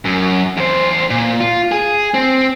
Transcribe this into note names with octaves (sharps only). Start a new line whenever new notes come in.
F#2
E2 C5
A#2
F4
G#4
C4